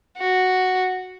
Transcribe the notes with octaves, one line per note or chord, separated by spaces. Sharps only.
F#4